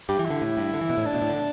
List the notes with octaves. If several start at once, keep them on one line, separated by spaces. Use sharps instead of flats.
G2 G4
E3
D3 E4
A2
G2
D3
E3
B2
A2
D4
B2
A2
D3